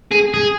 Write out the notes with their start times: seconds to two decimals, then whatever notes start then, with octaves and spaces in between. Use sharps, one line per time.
0.11 G#4
0.34 G#4